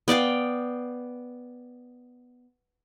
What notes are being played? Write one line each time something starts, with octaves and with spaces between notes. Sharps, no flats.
B3 D5 F5 G5